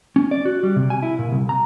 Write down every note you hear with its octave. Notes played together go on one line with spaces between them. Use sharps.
C#4
D5
F#4
G3
C3
G#5
E4
A#2
C2
A#5